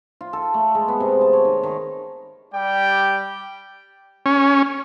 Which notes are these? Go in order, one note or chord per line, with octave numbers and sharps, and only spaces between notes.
F4
A4
A3
G#3
B3
C3
A5
C#5
D#3
D#3
G3 G4 D5 G5
C#4